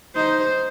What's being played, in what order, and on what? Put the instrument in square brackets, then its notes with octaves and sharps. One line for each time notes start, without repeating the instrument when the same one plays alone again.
[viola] D#4 [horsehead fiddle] C5